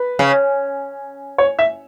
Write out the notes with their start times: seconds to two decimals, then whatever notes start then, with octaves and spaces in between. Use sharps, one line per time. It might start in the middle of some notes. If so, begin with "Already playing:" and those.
Already playing: B4
0.19 C#3
1.38 C#5
1.59 E5